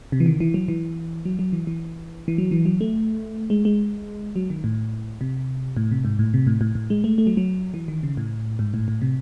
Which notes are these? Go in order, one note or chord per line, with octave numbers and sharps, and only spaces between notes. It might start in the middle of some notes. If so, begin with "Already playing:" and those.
C3
E3
D#3
E3
F#3
E3
F#3
F#3
E3
E3
E3
F#3
E3
F#3
A3
G#3
G#3
F#3
D#3
A2
C3
A2
C3
G#2
A2
C3
A2
A2
A2
G#3
A3
A3
F#3
F#3
E3
D#3
C#3
A2
G#2
A2
A2
C3